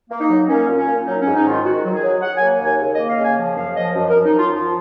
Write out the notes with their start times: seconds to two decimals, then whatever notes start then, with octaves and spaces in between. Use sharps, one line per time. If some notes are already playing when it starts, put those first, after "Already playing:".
0.10 A#3
0.20 D#4
0.29 F#3
0.49 A#3 C#4
0.68 A#2
0.77 C#4
0.88 A#2
1.06 F#3 D#4
1.21 C#4
1.26 G#2
1.36 D#4
1.46 D#3 F4
1.64 D#3 F#4
1.84 F#3
1.94 G#4
2.03 F#3
2.22 F#3 F#5
2.37 A#3 G#5
2.61 D#2 G#5
2.80 C#3
2.95 A#3 D#5
3.09 F5
3.18 C#3
3.24 G#5
3.39 F3
3.57 F#2 F5
3.76 F3 D#5
3.95 F#2
4.10 A#4
4.15 F#2
4.25 D#4
4.34 F3 F4
4.53 F3 F4